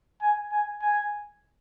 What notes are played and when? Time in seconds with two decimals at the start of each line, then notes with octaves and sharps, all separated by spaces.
0.21 G#5
0.52 G#5
0.82 G#5